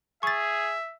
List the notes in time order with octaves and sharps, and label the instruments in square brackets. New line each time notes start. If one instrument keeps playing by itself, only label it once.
[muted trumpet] G#4 [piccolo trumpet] E5 [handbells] C#6 A6